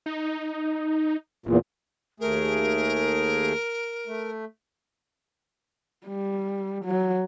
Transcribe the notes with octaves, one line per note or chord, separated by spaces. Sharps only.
D#4
F#1 E2 A#2
D#2 A3 G#4 A#4
A3
G3
F#3